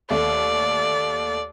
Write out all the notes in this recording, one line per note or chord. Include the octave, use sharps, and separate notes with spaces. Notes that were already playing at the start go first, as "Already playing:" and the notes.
D#2 A3 D5